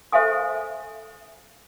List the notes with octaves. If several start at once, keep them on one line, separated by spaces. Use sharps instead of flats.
A4 C5 E5 F5 G#5 D#6